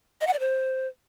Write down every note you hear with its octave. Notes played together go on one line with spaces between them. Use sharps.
D#5
F#5
D5
C5